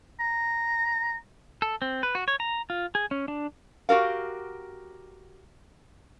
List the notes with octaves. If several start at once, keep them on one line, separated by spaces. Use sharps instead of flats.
A#5
A4
C4
B4
F#4
C#5
A#5
F4
G#4
C#4
D4
F#4 G4 A#4 F5